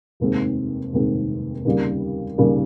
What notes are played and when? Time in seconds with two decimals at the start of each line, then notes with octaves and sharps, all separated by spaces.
0.20 F1 D#2 D#3 G#3 C4
0.93 F1 D#2 D#3 G#3 C4
1.65 D#2 C#3 G3 A#3
2.38 D#2 C#3 G3 A#3